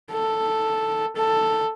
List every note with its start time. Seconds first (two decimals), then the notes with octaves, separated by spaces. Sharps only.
0.11 A4
1.16 A4